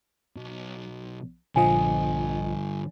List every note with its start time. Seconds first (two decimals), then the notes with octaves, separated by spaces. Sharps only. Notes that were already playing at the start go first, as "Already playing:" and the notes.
0.36 B1
1.56 A#1 G2 D3 F3 D#5 G#5